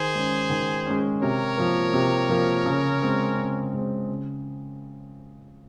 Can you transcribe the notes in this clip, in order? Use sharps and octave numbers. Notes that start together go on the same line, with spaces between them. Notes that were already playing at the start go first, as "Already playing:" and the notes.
Already playing: D#3 G#4 C5
G#3 C#4
D#3
G#3 C#4
C3 A#4 C#5
F3 A#3
C3
F3 A#3
C#3
G#3 C4
C#3
G#3 C4
C#3